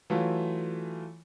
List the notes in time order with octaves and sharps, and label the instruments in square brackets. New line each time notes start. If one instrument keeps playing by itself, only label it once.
[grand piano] E3 F#3 A3 F4